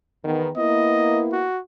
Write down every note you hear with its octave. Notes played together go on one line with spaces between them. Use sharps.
E2 D#3 B3
A#3 B3 E4 D#5
F#4